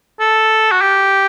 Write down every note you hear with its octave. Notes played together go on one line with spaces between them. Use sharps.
A4
F#4
G4